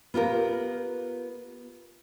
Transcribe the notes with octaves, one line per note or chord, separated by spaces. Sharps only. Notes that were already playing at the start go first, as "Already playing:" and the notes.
B3 F4 G4 A#4